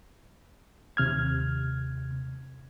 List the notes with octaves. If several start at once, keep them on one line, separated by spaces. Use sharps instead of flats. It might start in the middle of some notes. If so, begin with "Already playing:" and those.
D#2 C3 F6 G#6